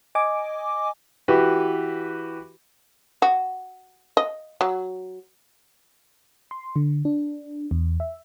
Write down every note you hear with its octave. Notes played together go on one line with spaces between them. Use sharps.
D#5 G#5 D6
E3 F#4 G4 B4
F#4
D#5
F#3
C6
D3
D4
E2
E5